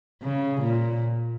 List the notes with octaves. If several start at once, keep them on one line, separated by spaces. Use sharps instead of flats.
C#3
A#2